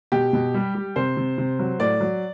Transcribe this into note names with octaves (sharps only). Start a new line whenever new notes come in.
B2 G4
B2
G3
G3
C3 C5
C3
C3
F#3
A2 D5
F#3